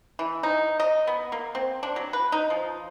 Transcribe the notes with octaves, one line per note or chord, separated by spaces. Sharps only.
E3
D#4
D#5
B3
A#3
C4
D4
F#3
B4
D#4
F3